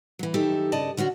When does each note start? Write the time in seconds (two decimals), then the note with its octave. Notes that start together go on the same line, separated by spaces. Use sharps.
0.19 E3 F#3
0.34 F#2 D#3 D#4 G4 A4 E5
0.72 G2 C#3 D5 D#5 A5
0.97 D3 C#4 D4 F#4